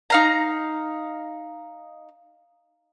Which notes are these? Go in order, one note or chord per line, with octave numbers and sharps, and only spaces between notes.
D#4 F5 A#5